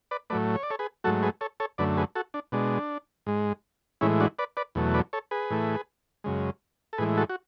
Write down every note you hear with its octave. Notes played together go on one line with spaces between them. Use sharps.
B4 D5
A2 F#3 A3 B4 D5
C#5
D5
A4 C#5
G#4 B4
G#2 F#3 A3 F#4 A4
G#4 B4
A4 C#5
A4 C#5
F#2 D3 A3 B4 D5
G#4 B4
F#4 A4
D4
B2 G#3 D4
G#2 G#3
A2 E3 G#3 C#4 E4
D4 F#4
B4 D5
B4 D5
E2 B2 F#3 A3
B4 D5
A4 C#5
G#4 B4
A2 E3 A3
F#2 C#3 G#3
A4
A2 E3 G#3 G#4 B4
F#4 A4
F#4